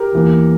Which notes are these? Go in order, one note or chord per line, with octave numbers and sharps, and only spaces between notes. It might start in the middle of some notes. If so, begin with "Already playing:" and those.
Already playing: G4 A#4
E2 E3 A#3